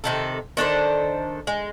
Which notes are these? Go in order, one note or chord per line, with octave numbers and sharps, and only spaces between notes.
C3 D#3 A4
D#3 D4 A4 C5
G#3